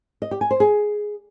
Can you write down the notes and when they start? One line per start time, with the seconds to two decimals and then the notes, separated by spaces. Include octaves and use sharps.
0.22 D#5
0.31 G4
0.41 G#5
0.51 C5
0.60 G#4